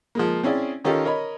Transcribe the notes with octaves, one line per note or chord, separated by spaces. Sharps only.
F3 G#3 A#3
C4 C#4 E4 G#4 D5
D#3 C#4 D#4 F4 G4 A4
A#4 C#5 D#5 B5